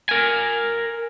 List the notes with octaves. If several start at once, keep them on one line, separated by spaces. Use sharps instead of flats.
A#4 G#5